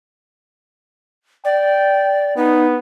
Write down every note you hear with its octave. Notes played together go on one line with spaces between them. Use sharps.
D5 G5
B3 D#4